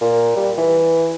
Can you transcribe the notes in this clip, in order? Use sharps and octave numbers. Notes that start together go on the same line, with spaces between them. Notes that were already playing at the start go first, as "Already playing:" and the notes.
A#2
G3
E3